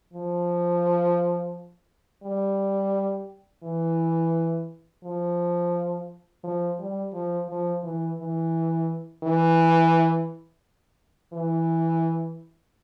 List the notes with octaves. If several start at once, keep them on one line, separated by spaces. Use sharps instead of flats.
F3
G3
E3
F3
F3
G3
F3
F3
E3
E3
E3
E3